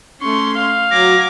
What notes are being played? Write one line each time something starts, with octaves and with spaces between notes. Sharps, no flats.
A3 C#4 C6 C#6
F5
F#3 G#5 D6 A#6